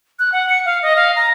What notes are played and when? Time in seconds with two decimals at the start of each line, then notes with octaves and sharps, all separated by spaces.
0.19 F#6
0.32 F#5
0.49 C#7
0.66 F5
0.82 D#5
0.96 F5
1.16 A#5